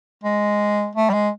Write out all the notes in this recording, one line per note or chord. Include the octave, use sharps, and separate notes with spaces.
G#3
A3
G3
G#3